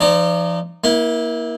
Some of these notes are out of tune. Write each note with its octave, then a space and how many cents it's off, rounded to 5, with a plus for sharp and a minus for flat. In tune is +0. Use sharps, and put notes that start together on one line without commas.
F3 -40 D#4 -20 D5 -5
A#3 +25 E4 -25